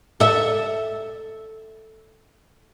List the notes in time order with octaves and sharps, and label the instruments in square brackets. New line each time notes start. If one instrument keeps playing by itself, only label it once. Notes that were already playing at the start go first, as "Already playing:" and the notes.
[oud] A4 E5